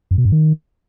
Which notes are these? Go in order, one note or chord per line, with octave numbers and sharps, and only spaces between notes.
F#2
B2
G2
D#3